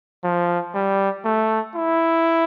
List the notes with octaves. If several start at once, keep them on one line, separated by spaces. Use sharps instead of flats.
F3
G3
A3
E4